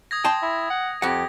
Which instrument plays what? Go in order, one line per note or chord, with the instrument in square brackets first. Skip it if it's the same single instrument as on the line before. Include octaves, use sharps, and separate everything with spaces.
[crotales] D#6 G#6 A#6
[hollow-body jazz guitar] G5 A5 C6
[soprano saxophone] E4
F#5
[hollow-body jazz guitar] F2 F#5 [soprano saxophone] G4 [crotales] A#6